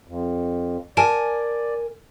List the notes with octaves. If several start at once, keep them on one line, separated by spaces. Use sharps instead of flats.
F2
A#4 D5 G#5 A5 D7